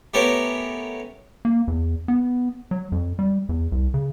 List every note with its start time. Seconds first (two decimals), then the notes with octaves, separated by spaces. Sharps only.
0.14 A3 B3 C#4 G4 A#4
1.45 A#3
1.68 E2
2.08 B3
2.71 F#3
2.92 F2
3.19 G3
3.49 E2
3.72 C2
3.94 C#3